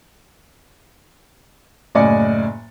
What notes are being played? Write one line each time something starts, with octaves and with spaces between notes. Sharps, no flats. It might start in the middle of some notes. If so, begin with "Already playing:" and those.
F#1 A2 D5 D#5 G#5 C#7